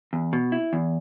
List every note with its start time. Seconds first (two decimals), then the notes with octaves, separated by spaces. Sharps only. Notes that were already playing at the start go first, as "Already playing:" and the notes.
0.13 E2
0.33 B2
0.52 E4
0.73 E2